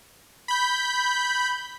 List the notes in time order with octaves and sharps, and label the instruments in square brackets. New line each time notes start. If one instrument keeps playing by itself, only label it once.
[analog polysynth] B5 G6